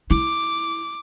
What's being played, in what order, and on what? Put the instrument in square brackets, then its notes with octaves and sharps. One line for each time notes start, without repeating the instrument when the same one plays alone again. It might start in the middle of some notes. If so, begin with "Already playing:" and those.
[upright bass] E4 [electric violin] D6